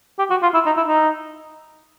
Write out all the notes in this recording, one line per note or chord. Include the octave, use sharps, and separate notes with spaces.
G4
F#4
F4
E4
D#4
E4
D#4